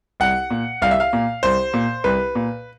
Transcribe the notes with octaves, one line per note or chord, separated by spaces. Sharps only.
C2 F#5
A#2
C2 F5
E5
F5
A#2
C2 C5
A#2
C2 B4
A#2